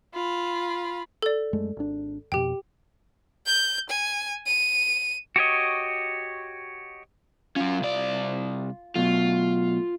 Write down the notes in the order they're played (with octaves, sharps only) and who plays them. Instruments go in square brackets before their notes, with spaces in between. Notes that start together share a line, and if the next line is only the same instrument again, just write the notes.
[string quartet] F4 B5
[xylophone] A4 D5
[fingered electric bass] F#2 G#3 A3
G#1 D4
[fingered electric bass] F2 B2 [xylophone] G4 G5
[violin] G6
G#5
D#7
[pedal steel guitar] F#4 G4 C#5 D#5
[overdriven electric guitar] F#3 C#4 [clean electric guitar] F4
[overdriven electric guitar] C2 D5
[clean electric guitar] B2 F#3 A3 [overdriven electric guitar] F4